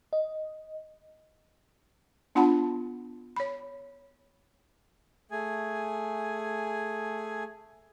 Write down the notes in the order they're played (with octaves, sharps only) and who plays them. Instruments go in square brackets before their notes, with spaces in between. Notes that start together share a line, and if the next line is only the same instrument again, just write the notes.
[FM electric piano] D#5
[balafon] B3 D4 F4 F#5 A5 B5
C#5 B5
[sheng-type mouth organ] A3 G#4 G#5